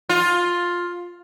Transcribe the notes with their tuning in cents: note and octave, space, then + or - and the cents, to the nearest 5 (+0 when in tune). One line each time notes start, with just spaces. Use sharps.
F4 +10